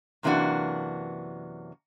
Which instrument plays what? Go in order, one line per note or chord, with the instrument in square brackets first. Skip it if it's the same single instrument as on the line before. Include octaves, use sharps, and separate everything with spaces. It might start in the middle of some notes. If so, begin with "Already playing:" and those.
[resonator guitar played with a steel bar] F#2 C3 E3 A#3 D4 F#4